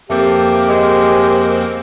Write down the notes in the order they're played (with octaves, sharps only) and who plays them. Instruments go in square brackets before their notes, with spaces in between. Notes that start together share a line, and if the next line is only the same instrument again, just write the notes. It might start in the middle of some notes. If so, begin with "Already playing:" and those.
[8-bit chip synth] F2 A#3 C4 [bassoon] A3 [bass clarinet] G4
[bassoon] G#3